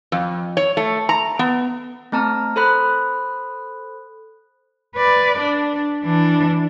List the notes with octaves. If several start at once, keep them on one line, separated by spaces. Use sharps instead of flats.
F2
C#5
A3
A#5
B3
A3 C4 A5 A#5 F6
A4 C5 B5 F#6
B4 D5
D4
E3 D4